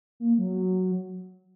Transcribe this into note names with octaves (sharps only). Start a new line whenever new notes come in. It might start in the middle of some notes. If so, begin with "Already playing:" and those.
A#3
F#3